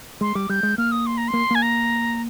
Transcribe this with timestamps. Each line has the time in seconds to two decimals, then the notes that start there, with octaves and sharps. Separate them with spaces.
0.21 G#3 C6
0.35 G3 D6
0.49 G3 G6
0.63 G#3
0.78 A#3 F6
0.92 D#6
1.07 C6
1.18 A#5
1.28 C6
1.34 A#3
1.51 A#3 G#5
1.62 A#5